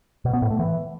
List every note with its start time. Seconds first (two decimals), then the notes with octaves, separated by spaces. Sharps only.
0.25 B2
0.33 B3
0.42 A2
0.50 A3
0.59 E3